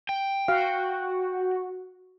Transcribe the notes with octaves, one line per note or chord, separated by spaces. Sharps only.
G5
F#4 F5